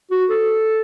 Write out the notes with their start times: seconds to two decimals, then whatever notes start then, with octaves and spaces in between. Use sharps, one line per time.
0.11 F#4
0.30 A4